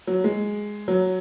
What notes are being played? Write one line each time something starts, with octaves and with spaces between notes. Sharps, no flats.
F#3
G#3
F#3